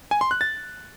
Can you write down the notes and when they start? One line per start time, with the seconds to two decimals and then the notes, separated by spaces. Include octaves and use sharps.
0.11 G#5
0.21 C6
0.31 F#6
0.41 A6